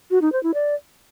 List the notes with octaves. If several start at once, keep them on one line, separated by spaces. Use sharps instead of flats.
F#4
D#4
C5
E4
D5